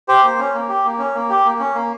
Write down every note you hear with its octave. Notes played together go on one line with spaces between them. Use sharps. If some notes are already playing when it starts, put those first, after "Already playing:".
G4 C5
A#3
C#4
A#3
G4
A#3
C#4
A#3
G4
A#3
C#4
A#3